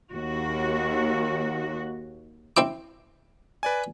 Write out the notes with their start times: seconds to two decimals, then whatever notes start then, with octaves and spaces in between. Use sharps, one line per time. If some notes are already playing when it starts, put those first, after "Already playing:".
0.12 D#2 F#4
2.57 C4 E4 D6
3.63 B4 D5 G#5